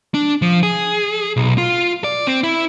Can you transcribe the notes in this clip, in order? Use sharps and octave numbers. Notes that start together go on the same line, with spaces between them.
D4
F3
G#4
B1
F4
D5
C4
E4